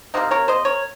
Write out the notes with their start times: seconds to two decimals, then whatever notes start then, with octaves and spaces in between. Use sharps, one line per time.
0.14 C3 F#3 A#3 C4 D#4
0.31 A#4 C#5
0.48 C5 D#5
0.65 A#4 C#5